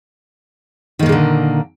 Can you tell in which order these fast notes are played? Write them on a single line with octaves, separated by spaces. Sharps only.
D#3 A#3 A#2 G#3 D3